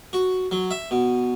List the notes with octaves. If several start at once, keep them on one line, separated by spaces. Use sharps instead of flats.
F#4
F#3
E5
B2